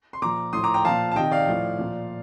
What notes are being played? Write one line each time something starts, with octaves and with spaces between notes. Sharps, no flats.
C6
A#2 F3 A#5 D6
A2 F3 C6 D#6
A#5 D6
G5 A#5
A#2 F3 F5 A5
A5
C3 D#3 D#5 G5
D5 F5
A2 F3
A#2 F3